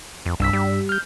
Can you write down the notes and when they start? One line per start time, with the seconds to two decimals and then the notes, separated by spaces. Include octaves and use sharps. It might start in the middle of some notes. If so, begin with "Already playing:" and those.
0.26 F2
0.40 C2 G2 E6 B6
0.53 G3
0.89 F6 G6